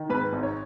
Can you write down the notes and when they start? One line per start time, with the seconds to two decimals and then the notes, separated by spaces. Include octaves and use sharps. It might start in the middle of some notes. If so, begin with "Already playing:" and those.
Already playing: D#3
0.10 G#2 B4
0.33 G#1
0.43 C#5